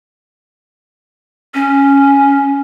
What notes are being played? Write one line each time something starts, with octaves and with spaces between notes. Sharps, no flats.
C#4